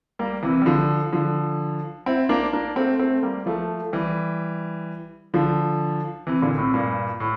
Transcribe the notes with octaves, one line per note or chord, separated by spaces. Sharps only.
G3 A#3
C3 E3
G3
D3 F3
D3 F3
C4 E4
A#3 D4
A#3 D4
A3 C4
A3 C4
G3 A#3
F3 A3
E3 G3
D3 F3
C3 E3
A#2 D3
A2 C3
G2 A#2
A2